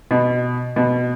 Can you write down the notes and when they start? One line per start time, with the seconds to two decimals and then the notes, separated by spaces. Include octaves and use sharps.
0.11 B2
0.76 B2